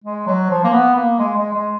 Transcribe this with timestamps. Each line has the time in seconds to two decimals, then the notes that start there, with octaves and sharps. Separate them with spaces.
0.04 G#3
0.27 F#3
0.50 F3
0.64 A#3
0.73 B3
0.95 A#3
1.19 G#3
1.36 G#3
1.53 G#3